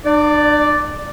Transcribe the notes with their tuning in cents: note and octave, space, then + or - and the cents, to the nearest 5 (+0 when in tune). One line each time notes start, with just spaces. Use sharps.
D4 +40 D5 +0